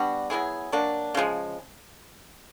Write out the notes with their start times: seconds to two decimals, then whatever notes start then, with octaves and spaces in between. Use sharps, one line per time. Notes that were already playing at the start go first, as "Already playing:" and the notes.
Already playing: G3 B3 D4 F#4
0.30 F#3 B3 E4 G#4
0.72 F#3 A#3 D4
1.15 C#3 F3 G#3